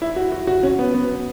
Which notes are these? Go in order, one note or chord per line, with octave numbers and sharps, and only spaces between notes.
E4
F#4
F#4
F#4
C#4
B3
B3